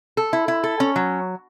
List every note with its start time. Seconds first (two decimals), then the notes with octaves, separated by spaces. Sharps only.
0.17 A4
0.33 E4
0.48 E4
0.64 A4
0.80 C#4
0.96 F#3